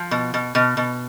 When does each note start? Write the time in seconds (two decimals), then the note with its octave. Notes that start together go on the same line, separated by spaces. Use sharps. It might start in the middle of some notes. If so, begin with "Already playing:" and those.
Already playing: F3
0.11 B2
0.34 B2
0.55 B2
0.77 B2